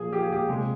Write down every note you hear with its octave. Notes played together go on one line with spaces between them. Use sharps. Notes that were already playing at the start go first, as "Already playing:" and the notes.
Already playing: A#2 F3 G#4
F3 G4
G#4
A#2 G4
C3 G#3